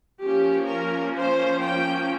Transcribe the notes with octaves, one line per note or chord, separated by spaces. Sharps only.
F3 A#3 C#4 G4
A#4
C5
G5